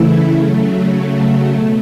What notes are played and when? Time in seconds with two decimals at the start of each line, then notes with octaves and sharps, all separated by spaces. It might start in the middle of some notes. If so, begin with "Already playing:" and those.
Already playing: C#3 E3 A3 E4
0.31 C#3 F#3 A3
1.51 B2 A3